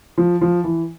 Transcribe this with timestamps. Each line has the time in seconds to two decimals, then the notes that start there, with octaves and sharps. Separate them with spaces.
0.18 F3
0.41 F3
0.64 E3